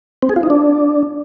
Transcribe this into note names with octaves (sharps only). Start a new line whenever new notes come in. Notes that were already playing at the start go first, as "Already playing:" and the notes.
C4
G#4
F4
D#4
D4